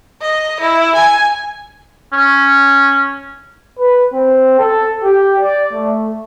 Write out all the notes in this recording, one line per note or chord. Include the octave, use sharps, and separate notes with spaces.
D#5
E4
G#5
C#4
B4
C4
A4
G4
D5
A3